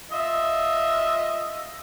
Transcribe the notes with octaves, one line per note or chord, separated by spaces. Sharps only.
F4 D#5 E5